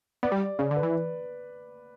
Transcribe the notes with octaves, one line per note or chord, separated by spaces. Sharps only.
B3 D5
G3
C#3 D5
D3
B4
E3